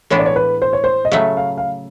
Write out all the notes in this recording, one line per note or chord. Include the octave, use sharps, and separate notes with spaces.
A2 E3 G#3 B3 D4 C#5
D5
C#5
B4
C5
C#5
C5
D#5
C#3 F#3 A3 E5
F5
F5